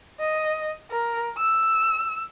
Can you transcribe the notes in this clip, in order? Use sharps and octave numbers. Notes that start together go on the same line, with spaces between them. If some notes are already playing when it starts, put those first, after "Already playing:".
D#5
A#4
E6